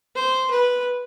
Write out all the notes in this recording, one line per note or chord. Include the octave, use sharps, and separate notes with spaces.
C5
B4